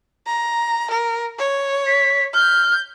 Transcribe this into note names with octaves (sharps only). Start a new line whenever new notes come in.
A#5
A#4
C#5
B6
F6 G6